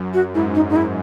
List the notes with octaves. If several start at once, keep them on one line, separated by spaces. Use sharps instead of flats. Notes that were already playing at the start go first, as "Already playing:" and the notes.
Already playing: F#2
F#4
G#2 E4
D#4
D#4
E4